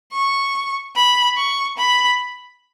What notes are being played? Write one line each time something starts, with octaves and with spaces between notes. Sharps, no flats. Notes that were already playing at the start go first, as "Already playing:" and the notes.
C#6
B5
C#6
B5